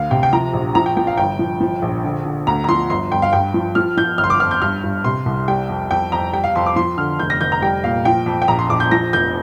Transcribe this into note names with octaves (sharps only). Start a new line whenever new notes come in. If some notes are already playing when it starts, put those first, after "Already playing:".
Already playing: D2 F5
C3 G5
G5
F3 A#5
A#1
F3 A#5
G5
F3 G5
F5
G1 G5
F3
F3
A#1
D3
D3
D2 A#5
A#5
F3 C6
G1 C6
G1 G5
F5
G2 G5
F3
F3 F6
F3 G6
G1 F6
C6
D6
F2 F6
G6
G2 F6
G2
C3 C6
C2
G3 G5
F2
F2 G5
F2 A#5
G3 G5
F5
F2 C6
D6
F3 C6
D3 F6
F1 G6
A#6
F1 G6
A#5
G3 G5
A#2 F5
F3 G5
F2
G5
A#1 A#5
C6
A#1 D6
G6
F3 A#6
F1 G6